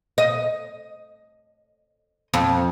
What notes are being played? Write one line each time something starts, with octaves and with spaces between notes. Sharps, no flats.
D#5
F2